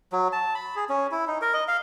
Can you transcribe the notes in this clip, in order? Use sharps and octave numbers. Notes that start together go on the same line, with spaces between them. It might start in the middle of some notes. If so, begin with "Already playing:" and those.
F#3
A5
B5
G#4
C#4
E4
D#4
A#4
D#5
F5